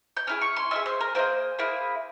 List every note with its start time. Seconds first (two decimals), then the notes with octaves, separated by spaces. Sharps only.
0.17 G6
0.27 C#4 E4 G#4 F6
0.41 C#6
0.56 C6
0.71 C#4 E4 E5
0.76 G#4
0.86 C5
1.01 A#4
1.15 A#3 E4 C5
1.19 G#4
1.59 A#3 E4 G#4